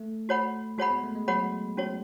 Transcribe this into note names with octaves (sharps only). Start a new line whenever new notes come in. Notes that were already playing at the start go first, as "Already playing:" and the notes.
Already playing: A3
F#4 C#5 F#5 B5
G#3 F#4 C#5 F#5 B5
B3
A3
G#3
F#3 F#4 C#5 F#5 B5
C#4 F#4 C#5